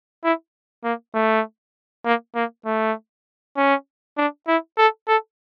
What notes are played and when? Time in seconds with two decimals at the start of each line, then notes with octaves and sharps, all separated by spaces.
0.24 E4
0.84 A#3
1.14 A3
2.05 A#3
2.35 A#3
2.65 A3
3.56 C#4
4.17 D4
4.48 E4
4.78 A4
5.08 A4